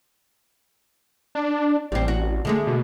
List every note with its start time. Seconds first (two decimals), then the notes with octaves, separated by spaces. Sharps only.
1.35 D4
1.92 A1 G3 C4
2.08 F#4
2.45 D3 G#3 A3
2.67 B2